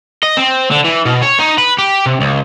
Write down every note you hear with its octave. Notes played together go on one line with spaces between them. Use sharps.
D#5
C4
D3
E3
B2
C#5
D#4
B4
G4
C3
C#2